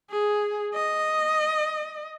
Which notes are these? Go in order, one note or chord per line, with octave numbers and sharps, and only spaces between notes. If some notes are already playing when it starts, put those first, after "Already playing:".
G#4
D#5